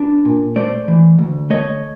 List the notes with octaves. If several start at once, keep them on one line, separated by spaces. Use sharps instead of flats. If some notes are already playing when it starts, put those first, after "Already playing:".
Already playing: D4 B4
A#2
A3 C5 D5
E3
D2
A3 C#5 D#5